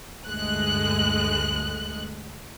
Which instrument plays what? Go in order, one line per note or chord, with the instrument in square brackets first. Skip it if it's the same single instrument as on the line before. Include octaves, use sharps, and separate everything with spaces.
[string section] D2 G2 G#3 A3 F#6